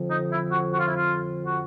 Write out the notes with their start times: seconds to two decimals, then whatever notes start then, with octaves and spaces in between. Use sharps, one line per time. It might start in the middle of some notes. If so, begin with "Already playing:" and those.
Already playing: F2 D3 F3
0.10 D#4
0.32 E4
0.52 F#4
0.73 F#4
0.80 F4
0.87 E4
0.95 F4
1.46 F#4